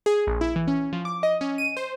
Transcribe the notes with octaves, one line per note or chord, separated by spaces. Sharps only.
G#4
A#1
E4
E3
C#4
F3
D6
D#5
C#4
D#7
C5